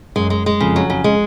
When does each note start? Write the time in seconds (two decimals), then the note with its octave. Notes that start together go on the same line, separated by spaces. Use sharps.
0.16 F#2 G#3
0.30 G#3
0.46 G#3
0.60 F2 C#3
0.76 F#3
0.90 C#3
1.04 G#3